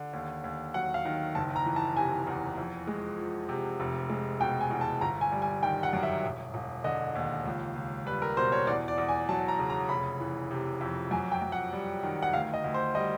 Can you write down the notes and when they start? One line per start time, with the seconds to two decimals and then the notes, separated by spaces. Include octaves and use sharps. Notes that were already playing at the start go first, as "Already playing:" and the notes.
Already playing: D3
0.13 D#2
0.44 D#2
0.74 F#3 F#5
0.94 F5
1.05 D#3
1.35 F#1 A5
1.56 A#5
1.66 E3
1.76 A5
1.96 C3 G#5
2.27 E2
2.58 F2
2.88 G#3
3.18 F3
3.49 C3
3.80 F1
4.10 G#3
4.41 B2 G5
4.61 G#5
4.71 E2
4.81 A5
5.01 G1 A#5
5.21 G#5
5.32 G3
5.42 G#5
5.62 D#3 G5
5.83 F#5
5.93 F#2
6.03 E5
6.23 E1
6.54 E1
6.84 D3 D#5
7.15 D#2
7.45 C#2
7.76 C#2
8.06 G3 B4
8.22 A#4
8.37 B2 C5
8.52 C#5
8.67 E2 D5
8.88 D5
8.98 E2
9.09 G#5
9.29 F#3 A5
9.48 A#5
9.59 C#3
9.70 A#5
9.89 F1 B5
10.20 E3
10.51 C3
10.81 F2
11.11 F#2 G#5
11.32 G5
11.42 F#2
11.52 F#5
11.72 G3
12.03 D#3
12.23 F#5
12.33 D2 F5
12.54 D#5
12.64 D2
12.74 C5
12.95 G3 D#5